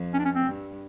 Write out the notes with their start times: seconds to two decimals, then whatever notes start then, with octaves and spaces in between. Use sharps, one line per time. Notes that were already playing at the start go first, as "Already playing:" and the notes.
Already playing: F2
0.14 C#4
0.19 D4
0.25 C#4
0.35 C4
0.46 G2